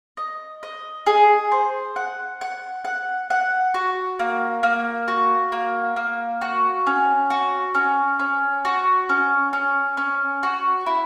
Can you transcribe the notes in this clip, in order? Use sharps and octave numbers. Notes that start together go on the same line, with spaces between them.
D#5
D#5
G#4
C5
F#5
F#5
F#5
F#5
F#4
A#3
A#3
F#4
A#3
A#3
F#4
C#4
F#4
C#4
C#4
F#4
C#4
C#4
C#4
F#4
E4